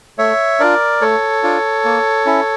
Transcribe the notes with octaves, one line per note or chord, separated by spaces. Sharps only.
A3 C#5 E5
D4 F4 A#4 D5
A3 A4 C#5
D4 F4
A#3
C#4 E4